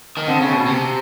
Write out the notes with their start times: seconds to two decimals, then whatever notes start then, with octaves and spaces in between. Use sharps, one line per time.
0.17 D#3
0.28 D3 C4
0.41 C#3
0.53 B2
0.66 C3